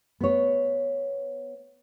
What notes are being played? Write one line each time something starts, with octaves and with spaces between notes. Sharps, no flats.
B3 C#5